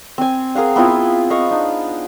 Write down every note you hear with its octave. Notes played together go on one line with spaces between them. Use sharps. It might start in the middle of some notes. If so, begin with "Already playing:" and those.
C4 G#5
G#4 A#4 F5 F#5
B3 C4 E4 F4
D#5 F5 C#6
D4 D#4